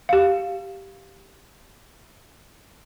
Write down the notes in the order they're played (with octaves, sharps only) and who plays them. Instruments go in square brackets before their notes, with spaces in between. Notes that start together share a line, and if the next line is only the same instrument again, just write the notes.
[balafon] G4 F5